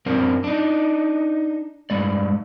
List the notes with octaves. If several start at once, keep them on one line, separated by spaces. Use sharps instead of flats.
F#2 C4 D4 A#4 C5
D4 D#4
G2 G#3 D5